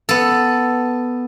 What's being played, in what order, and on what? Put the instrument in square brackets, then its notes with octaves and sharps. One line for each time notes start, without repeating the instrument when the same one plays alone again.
[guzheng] B3 A4